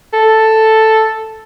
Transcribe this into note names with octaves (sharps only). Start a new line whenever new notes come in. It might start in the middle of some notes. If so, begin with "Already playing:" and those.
A4